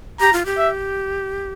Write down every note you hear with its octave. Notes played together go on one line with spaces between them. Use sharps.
G4 A#5
F4
G4
E5